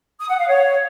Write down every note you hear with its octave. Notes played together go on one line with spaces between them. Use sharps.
D#6
F#5
F5
C#5